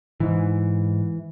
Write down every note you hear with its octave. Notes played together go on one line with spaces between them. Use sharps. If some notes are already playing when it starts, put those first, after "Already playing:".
G#2 E3